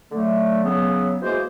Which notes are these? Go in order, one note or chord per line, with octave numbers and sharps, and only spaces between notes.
D3 F#3 A3
C#3 F#3 B3
E3 G#3 A#3 F#4 G#4 C5